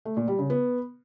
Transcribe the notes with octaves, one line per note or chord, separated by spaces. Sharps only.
A3
A#2
G3
C#3
B3